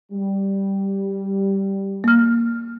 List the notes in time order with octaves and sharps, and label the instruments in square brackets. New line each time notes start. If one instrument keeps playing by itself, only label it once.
[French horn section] G3
[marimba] A#3 F6